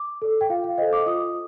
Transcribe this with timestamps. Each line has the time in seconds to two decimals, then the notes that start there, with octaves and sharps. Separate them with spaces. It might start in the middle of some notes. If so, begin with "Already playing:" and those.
Already playing: D6
0.22 A4 D5
0.41 G5
0.50 F4 F5
0.64 F5
0.78 A4 C5 D#5
0.93 D6
1.07 F4 D#6